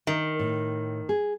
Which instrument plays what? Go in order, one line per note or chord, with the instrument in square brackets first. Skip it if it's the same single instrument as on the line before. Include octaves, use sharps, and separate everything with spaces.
[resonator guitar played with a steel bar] D#3 [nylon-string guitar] A#4
[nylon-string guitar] A2
G#4